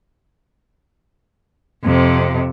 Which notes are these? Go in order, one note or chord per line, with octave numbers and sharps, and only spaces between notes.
F2 C3